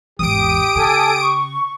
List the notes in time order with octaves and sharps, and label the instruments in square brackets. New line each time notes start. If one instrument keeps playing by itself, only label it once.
[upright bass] G#1 E2 [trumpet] G4 [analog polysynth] D#6 D7
[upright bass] C#3 [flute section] A4 G#5
[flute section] C#6